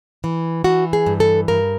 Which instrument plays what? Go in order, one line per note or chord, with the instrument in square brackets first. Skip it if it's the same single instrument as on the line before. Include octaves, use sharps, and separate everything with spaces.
[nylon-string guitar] E3
E3 F#4
G#4
G2
A4
G2 A#4